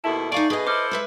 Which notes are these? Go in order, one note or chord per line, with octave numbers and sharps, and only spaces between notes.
D#2 B2 E4 A4 E5 A5
D#4 D5 F5 G#5 C#6 D7
B2 G#4 B4 D#5
E4 A4 C5 D6 F6
G#3 B4 E5